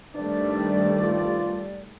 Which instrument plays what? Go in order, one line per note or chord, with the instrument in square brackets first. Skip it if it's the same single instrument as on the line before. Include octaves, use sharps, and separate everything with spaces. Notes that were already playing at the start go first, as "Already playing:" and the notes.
[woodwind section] G2 C3 D5 [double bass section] D#3 G3 A3 [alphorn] D4
[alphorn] F4